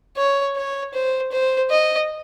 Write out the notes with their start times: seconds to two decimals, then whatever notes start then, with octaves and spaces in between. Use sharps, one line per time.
0.17 C#5
0.56 C#5
0.94 C5
1.32 C5
1.70 D#5